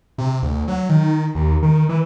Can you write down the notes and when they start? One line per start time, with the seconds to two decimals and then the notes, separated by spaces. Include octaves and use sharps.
0.18 C3
0.42 D2
0.68 F#3
0.89 D#3
1.35 D#2
1.63 D#3
1.89 E3